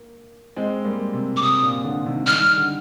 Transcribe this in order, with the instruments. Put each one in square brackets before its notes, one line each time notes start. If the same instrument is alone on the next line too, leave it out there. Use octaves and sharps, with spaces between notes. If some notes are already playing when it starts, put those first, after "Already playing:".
Already playing: [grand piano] A#3
G#3 C4
G3 A#3
C3
[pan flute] D6
[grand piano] C3 [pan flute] D#6
[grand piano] A#2
A#2 D3
C3 D#3
[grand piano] D#3 G3 [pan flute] F6
[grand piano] D3